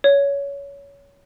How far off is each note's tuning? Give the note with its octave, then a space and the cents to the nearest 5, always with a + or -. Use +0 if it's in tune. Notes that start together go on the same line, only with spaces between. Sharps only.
C#5 +20